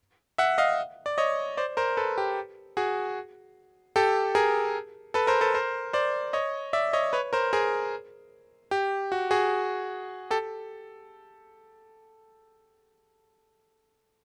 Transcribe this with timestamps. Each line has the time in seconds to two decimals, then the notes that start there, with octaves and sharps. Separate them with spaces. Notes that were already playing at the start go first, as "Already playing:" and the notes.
0.38 E5 F#5
0.58 D#5 F5
1.06 D5
1.18 C#5 D#5
1.57 C5 D5
1.77 A#4 C5
1.97 A4 B4
2.18 G4
2.77 F#4 G#4
3.96 G4 A4
4.35 G#4 A#4
5.14 A4 B4
5.27 A#4 C5
5.41 A4 B4
5.54 A#4 C5
5.93 C5 D5
6.33 C#5 D#5
6.73 D5 E5
6.93 C#5 D#5
7.13 B4 C#5
7.33 A#4 C5
7.53 G#4 A#4
8.71 G4
9.12 F#4
9.31 F#4 G#4
10.30 G4 A4